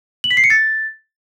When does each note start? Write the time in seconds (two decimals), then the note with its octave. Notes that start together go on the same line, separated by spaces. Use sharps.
0.24 F#7
0.31 B6
0.37 C7
0.44 C#7
0.50 A6